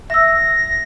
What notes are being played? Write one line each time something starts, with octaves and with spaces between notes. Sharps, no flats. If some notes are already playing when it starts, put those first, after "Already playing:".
E5 E6 A#6